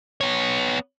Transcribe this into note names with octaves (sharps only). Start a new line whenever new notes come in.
B3 C#5